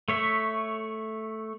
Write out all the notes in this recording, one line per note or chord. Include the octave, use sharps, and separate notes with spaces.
A3 C#5 E5